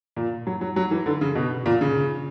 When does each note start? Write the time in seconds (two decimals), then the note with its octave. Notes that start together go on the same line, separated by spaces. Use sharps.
0.17 A#2
0.47 F#3
0.61 F#3
0.76 F#3
0.91 E3
1.06 D3
1.21 C#3
1.35 B2
1.66 A#2
1.81 C#3